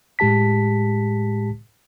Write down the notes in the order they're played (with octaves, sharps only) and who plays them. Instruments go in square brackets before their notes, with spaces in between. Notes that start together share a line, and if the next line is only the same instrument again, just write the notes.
[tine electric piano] A2 G#3 G4 A5 B6